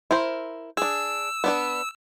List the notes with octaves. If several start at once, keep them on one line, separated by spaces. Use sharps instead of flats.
E4 A#4 C5
D4 G#4 E6
B3 D4 B4